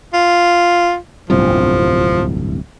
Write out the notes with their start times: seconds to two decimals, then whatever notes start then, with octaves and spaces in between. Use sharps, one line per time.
0.13 F4
1.30 D1 G1 C2 F3